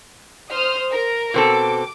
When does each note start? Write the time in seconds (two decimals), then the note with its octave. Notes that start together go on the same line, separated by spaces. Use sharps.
0.51 C5 D#6 F6
0.91 A#4
1.34 B2 C4 A4 D6